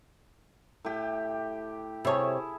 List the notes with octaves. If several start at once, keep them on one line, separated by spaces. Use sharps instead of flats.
A2 G4
C3 E4 G#4 A4 C#5